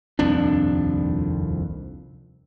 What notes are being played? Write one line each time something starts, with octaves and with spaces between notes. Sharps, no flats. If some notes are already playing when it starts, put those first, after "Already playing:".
D#1 C2 F2 D4